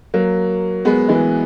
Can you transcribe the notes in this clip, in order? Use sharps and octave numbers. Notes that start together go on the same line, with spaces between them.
F#3 A#3
G#3 B3
E3 G#3